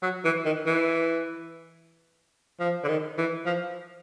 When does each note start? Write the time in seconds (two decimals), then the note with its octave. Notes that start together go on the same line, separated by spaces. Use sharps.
0.02 F#3
0.24 E3
0.45 D#3
0.66 E3
2.60 F3
2.84 D3
2.88 D#3
3.18 E3
3.46 F3